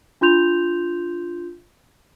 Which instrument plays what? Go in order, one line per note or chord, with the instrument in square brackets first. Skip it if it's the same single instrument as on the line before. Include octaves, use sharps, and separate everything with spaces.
[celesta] D4 F4 C6 G6 F7